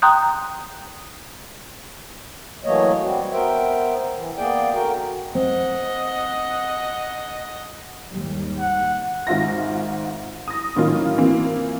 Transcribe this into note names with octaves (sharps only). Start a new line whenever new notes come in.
G5 A#5 C6 D#6 F#6 G6
E3 F#3 A3 A#3 C#5 D#5
G3 C4 F#4
B3 A#4 C5 E5 G5
E3
A#3 B3 G#4 D5 G5
D3 F#4 A#4 G5
C4 D#5 F#5
D#2 G#2 G3
F#5
G#1 G#2 F4 E5 A#6
D#6 A#6
A2 D#3 F#3 A#3 C#4 F4
E3 A#3 C4 F4